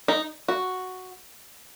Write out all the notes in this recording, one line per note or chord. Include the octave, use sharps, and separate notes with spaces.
D#4
F#4